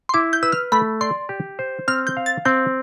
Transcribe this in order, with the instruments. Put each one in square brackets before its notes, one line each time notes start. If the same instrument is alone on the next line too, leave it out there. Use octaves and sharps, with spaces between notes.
[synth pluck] C6
[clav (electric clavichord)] E4 [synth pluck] D6
[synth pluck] G6
[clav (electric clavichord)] B4 [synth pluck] E6
[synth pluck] F6
[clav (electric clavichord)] A3 [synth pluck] B5
[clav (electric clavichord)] D5 [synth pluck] C6
[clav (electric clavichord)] G4
C5
[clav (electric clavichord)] C4 [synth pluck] F6
[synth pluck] G6
[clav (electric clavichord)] F5
[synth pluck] A6
[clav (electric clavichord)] C4 [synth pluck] G6